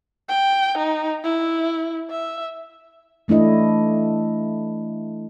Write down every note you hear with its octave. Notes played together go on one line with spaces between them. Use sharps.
G5
D#4
E4
E5
E3 A3 D4 E4 D#5